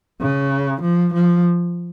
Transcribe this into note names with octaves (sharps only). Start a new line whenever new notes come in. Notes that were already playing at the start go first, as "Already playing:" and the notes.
C#3
F3
F3